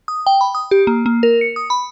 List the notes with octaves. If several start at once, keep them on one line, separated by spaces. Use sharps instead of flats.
D#6
G5
B5
D#6
G4
A#3
A#3
A#4
C#7
D#6
B5